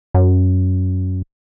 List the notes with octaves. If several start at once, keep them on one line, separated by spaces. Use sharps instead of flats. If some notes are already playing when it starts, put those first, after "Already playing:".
F#2